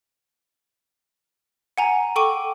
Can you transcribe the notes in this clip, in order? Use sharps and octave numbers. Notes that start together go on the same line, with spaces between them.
F#5 G#5 A#5
A4 G5 C#6 D6 D#7